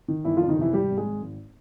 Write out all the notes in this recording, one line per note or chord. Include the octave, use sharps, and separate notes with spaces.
D#3
G1 E3 E4
F2 F3 F4
D#3 D#4
C3 E3 E4
G#1 G3 G4
G#1
G#3 G#4
G#1
G#1